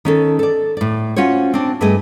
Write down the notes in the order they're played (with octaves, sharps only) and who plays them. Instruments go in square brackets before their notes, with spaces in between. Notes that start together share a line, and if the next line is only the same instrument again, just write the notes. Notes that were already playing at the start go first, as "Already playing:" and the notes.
[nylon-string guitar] D#3 C#4 A4
A4 D5
A2 D5
C#4 F4 F#4 C5 C#5
C4 D4
G2 A3 G#4 D#5 G#5